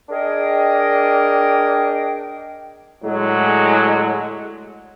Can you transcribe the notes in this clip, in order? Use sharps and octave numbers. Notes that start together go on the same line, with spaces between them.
D4 G#4 A#4 D#5 G5
A2 D3 F#3 G#3